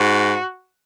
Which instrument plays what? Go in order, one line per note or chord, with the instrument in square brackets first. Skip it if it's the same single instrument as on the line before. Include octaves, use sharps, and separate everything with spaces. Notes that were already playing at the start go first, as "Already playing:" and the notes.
Already playing: [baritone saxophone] G#2 [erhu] F#4